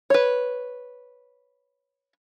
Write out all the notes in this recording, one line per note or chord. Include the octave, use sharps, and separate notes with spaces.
B4 C#5